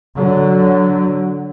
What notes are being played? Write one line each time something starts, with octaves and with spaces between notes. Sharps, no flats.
D3 F#3